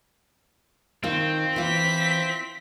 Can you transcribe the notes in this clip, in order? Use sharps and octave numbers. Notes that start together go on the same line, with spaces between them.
D#3 C4 F4
E3 F4 B6